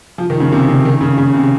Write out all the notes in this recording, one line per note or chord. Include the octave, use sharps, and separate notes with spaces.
F3
D#3
C#3
C3
C#3
D#3
C#3
C#3
C3